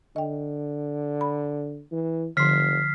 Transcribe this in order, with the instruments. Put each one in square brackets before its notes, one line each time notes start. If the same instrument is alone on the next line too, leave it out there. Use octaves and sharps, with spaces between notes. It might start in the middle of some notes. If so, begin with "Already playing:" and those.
[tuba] D3 [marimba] D#5 G5
[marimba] B5
[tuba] E3
[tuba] F#1 [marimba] D3 F3 C6 [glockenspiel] F6 B6 C7